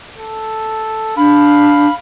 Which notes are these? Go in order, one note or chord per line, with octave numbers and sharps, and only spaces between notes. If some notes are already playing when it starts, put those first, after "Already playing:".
A4
D4 F5 B5